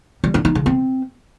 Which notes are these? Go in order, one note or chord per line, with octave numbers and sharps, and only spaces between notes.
G3
D4
D#4
C#3
C4